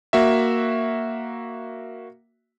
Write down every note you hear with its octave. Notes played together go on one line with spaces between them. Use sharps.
A#3 F#4 E5